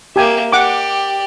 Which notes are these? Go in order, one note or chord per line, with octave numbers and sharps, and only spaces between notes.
A#3 G4 E5 G#5
G4 D5 F#5 D6